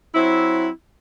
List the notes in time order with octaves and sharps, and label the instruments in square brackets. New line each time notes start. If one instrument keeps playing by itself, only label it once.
[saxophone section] F#3 C4 E4